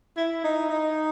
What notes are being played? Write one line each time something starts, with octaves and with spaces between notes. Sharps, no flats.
E4
D#4
D#4